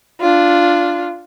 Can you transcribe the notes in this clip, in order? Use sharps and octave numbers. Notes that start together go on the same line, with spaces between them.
D4 F4